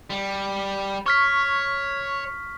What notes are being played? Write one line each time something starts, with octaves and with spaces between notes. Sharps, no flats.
G3
C#5 C#6 F6 B6